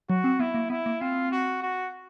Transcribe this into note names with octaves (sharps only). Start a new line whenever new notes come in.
F#3 F#4
C4
B3 E4
A#3
B3 E4
A#3
C4 F4
F#4
F#4